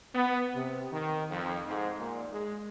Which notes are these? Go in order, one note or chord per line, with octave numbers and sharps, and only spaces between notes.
B3
C3
D#3
F2
G#2
A#2
G#3